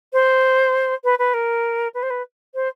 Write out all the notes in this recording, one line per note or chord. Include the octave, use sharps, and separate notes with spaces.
C5
B4
B4
A#4
B4
C5
B4
C5